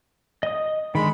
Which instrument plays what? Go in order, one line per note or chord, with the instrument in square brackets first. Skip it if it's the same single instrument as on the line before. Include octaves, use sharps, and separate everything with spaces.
[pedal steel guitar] D#5 D#6
[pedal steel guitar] D3 D#3 [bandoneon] G#3 B5